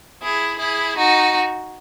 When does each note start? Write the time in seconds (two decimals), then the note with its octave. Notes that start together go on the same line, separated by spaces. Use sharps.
0.22 E4 G#4
0.59 E4 G#4
0.97 D#4 F#4